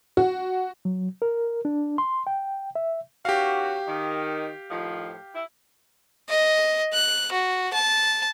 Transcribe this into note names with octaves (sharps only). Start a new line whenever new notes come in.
F#4
F#3
A#4
D4
C6
G5
E5
D#3 C#4 F#4 G4 F5
D#3
A2 D#3 F3
E4
D#5
F#6
F#4
A5